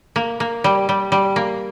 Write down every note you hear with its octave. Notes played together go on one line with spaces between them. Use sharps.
A#3
A#3
G3
G3
G3
A#3